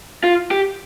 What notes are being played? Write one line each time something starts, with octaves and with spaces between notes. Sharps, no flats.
F4
G4